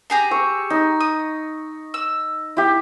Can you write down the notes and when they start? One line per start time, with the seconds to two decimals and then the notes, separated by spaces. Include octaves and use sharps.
0.10 G4 G#4 A#5
0.31 C#6 E6
0.70 D#4
1.01 D#6
1.94 E6
2.57 E4 G4